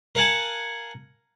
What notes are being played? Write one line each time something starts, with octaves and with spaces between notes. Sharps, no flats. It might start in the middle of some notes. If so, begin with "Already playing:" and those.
A#4 F5 F#5 G#5 A5